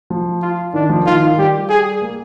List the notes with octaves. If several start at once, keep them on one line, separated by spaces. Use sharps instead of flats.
F3
F4
D#3 D4
F3
D#3 F4
D#3
G3 G4
G#4
A#3